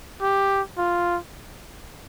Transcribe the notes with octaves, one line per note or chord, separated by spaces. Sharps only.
G4
F4